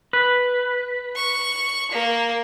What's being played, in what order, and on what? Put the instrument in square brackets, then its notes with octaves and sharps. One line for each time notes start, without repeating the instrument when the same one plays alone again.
[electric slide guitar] B4
[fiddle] C#6
A#3